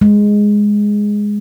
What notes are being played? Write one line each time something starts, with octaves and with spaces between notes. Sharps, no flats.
G#3